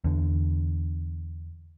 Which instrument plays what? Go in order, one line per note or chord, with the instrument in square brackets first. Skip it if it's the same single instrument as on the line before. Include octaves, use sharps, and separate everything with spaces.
[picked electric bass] E2 D3